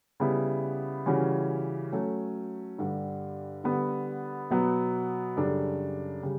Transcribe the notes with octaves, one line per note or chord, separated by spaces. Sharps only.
C#3 G3 B3 E4
C#3 E3 G3 C#4 F#4
F#3 A3 C#4
G2 D3 G3
D3 G3 B3
B2 F#3 B3
F#2 C#3 G3 D4 A4
C#3 G3